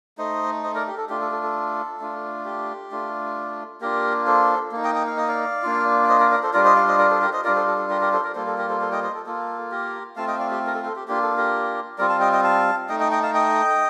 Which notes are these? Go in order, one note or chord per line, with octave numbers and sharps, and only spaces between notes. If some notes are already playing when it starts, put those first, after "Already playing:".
A3 D#4 C5 D#5
C5 D#5
A#4 D5
G4
A4
A3 D4 F4 G4
A4
A4
A4
A3 D4 F4
G4
A3 D4 F4
A#3 D4 F4 G4 A#4
A4 C5
A#3 D#4
D#5 G5
D#5 G5
F5
D#5
D5 F5
A#3 D4 F4
D5
C5 D#5
A#4 D5
A#4 D5
A4 C5
G3 D4 F4 A#4 D5
C5 D#5
D5 F5
C5 D#5
A#4 D5
A4 C5
G4 A#4
C5 D#5
G3 D4 F4 A#4 D5
A4 C5
A4
A4
G4 A#4
G4 A#4
A4 C5
A#4 D5
G3 A#3 F4 A4 C5
A4
G4 A#4
A4 C5
A4 C5
D#5 G5
C5 D#5
A4
A#3 F4 A4
G4 A#4
A3 C4 F4 F5 A5
D#5 G5
D5 F5
G4
A#4
A4
A4 C5
G4
A#3 D4 F4 G4
A4
G4 A#4
G3 C4 F4 A#4 D5
F5 A5
D#5 G5
D#5 G5
F5 A5
A3 D#4 D#5 G5
D#5 G5
D#5 G5
F5 A5
D#5 G5